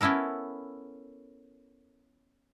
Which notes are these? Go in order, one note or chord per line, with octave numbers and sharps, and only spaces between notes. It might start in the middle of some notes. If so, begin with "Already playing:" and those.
B3 C#4 E4 A4 A#4